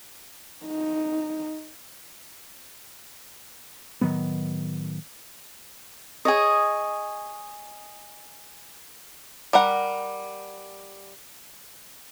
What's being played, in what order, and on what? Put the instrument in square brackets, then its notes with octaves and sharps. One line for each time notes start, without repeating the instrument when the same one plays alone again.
[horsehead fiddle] D#4
[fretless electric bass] A2 D#3 F#3 B3
[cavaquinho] G#4 C#5 D#5
[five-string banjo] G3 A#4 F#5